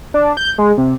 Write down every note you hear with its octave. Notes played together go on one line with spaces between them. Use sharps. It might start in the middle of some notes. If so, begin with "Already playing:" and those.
D4
G6
G#3
C3